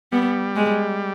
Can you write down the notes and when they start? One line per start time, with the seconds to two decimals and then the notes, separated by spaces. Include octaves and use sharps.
0.12 G3 B3
0.56 G#3